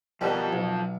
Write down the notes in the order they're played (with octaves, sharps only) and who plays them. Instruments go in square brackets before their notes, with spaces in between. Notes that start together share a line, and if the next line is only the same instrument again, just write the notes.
[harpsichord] B2 D#3 G3 [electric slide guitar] F3 A4
[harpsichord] B1